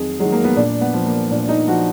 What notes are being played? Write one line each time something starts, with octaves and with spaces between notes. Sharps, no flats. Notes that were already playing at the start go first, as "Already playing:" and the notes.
Already playing: F2 D#3 F#3 G#4
D#3 F#3 G#3
A#3
B3
A#2 D4
B3
F3
A#3
A#2 D4
D#4
F3 F#4